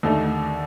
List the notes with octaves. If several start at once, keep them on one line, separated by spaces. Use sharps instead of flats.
D#2 D3 A3 D#4